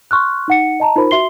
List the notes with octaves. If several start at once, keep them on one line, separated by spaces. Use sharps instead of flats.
C6 C#6 F6 F#6
D#4 F#5 C#7
D#5 A5 A#5
D#4 F4 A#4 C5 B5
F#4 E5 C6 C7 G7